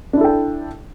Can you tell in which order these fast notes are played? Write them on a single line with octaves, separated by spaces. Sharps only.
D4 E4 A4 G5